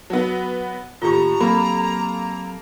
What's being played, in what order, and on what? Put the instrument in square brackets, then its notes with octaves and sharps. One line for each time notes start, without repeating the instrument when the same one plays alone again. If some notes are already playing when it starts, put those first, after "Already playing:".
[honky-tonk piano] F#3 B3
[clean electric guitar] D#2 B5 [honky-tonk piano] A2 C#6 [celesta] F4 G4 [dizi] A#5
[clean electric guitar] F#3 C4 G4 [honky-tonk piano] A#3 A4 [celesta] B5